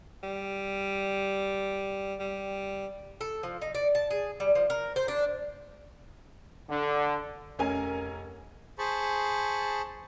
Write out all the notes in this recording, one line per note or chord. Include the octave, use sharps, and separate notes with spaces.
G3
G3
A4
F3
D#4
D5
A5
G#4
G3
F3
A#4
C5
D4
D3
F1 C#4 A#4 G#5
G#4 C5 A5 B5 C#6